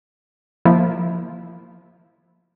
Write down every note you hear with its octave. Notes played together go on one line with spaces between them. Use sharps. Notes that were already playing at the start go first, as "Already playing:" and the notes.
F3 A#3 E4